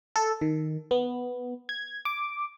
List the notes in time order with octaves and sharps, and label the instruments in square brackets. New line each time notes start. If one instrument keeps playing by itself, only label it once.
[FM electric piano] A4
D#3
B3
G#6
D6